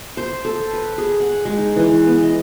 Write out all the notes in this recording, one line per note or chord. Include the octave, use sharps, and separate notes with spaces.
C5
A4
B4
G#4
F#5
G#3
D#4
E3
B3
D#5